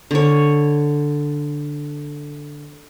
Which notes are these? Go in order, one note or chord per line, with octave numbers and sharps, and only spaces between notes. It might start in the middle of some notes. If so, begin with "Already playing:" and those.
D3 C#5